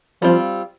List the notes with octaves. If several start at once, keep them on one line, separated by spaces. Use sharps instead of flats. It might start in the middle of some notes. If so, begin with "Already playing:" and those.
F3 G3 C4 F4